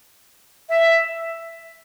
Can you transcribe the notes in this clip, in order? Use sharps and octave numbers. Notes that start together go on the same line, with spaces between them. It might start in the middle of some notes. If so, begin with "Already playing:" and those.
E5